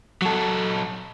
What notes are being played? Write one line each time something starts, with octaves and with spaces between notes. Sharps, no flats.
F#3 A4